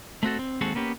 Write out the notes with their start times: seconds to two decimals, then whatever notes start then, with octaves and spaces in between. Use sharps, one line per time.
0.23 A3 C4 F#4 A4
0.39 C4
0.61 D#2 G#3 C4 F#4 G#4 A4
0.75 A#3 B3 C#4 G4